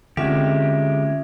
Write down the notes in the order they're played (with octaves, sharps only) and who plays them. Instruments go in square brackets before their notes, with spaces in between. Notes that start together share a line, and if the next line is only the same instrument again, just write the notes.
[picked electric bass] D3 C4 [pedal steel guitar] G#3 G4 [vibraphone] C#4 F4 E5